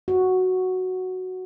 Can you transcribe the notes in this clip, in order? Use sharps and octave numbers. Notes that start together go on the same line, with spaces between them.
F#4